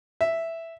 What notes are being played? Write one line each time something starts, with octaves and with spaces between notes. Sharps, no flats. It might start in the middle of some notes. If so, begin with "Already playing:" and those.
E5